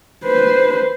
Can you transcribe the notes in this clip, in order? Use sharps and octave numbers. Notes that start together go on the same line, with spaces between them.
B4 C5